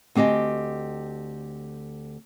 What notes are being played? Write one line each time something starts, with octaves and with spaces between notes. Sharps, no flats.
D2 C4 G4 D#5 G#5